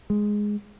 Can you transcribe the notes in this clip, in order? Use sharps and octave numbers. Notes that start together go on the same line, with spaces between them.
G#3